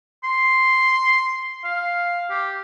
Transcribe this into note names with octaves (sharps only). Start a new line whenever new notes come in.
C6
F5
G4